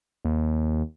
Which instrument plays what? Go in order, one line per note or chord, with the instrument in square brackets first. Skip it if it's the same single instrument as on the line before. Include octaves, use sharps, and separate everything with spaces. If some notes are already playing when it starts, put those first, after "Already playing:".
[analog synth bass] D#2